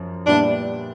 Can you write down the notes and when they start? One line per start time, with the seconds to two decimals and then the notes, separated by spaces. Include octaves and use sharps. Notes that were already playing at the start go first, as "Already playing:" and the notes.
Already playing: F#2 F3 C#4
0.27 A#2 G3 B3 D4 E4